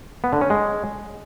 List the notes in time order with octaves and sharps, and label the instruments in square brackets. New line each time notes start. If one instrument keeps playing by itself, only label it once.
[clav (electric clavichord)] B3
D3
C#4
G#3